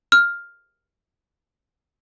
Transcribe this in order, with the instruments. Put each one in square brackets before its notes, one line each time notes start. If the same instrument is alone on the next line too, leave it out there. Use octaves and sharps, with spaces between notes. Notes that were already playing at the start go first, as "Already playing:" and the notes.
[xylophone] F6